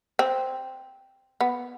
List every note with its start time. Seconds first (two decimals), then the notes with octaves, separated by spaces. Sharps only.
0.19 C4
1.41 B3